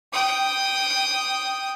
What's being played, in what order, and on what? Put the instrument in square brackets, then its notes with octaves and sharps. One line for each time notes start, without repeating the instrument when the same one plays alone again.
[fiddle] G5 D#6